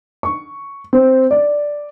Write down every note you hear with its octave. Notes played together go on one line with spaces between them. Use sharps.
C#6
C4
D5